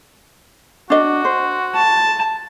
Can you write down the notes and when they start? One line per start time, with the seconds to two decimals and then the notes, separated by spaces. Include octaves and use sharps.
0.90 D4 F#4 D#5
1.25 C5
1.75 A5